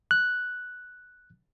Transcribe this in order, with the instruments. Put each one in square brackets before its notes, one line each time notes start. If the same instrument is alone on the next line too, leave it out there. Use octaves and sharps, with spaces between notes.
[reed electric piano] F#6